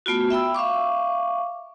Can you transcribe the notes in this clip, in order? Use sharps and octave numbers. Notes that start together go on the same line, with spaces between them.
A3 B3 F4 F#4
E5 G5 B5 E6
E5 F5 C#6 D6